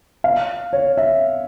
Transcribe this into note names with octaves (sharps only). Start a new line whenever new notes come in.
F5
C#5
E5